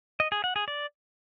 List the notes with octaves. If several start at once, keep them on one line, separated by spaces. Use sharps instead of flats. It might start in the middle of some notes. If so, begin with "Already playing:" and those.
D#5
G#4
F#5
G#4
D5